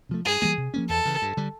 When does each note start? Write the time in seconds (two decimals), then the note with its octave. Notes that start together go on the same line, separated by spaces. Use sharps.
0.09 C3 F3 A3
0.25 G2 G#4
0.42 E3 G3 A#3
0.57 C3
0.74 F3 A#3 C#4
0.89 E2 A4
1.05 C#3 E3
1.22 G2
1.37 D3 G3